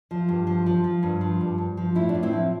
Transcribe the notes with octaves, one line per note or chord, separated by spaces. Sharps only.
F3
G2
F3
F3
F3
G2
F3
G2
G2
F3
A2 E4
D4
A2
C4 E4
F3